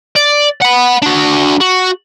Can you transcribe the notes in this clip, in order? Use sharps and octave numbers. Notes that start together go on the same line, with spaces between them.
D5
F#5 B5
D4 F#4
F#4